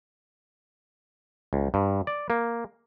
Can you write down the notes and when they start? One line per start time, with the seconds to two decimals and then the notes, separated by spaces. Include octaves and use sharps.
1.53 C#2
1.74 G2
2.07 D5
2.30 A#3